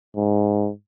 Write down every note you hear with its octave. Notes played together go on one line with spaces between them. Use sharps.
G#2